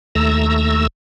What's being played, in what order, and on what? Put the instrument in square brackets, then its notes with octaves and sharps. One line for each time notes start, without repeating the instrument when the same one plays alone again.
[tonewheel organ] D#2 A3 A#5 E6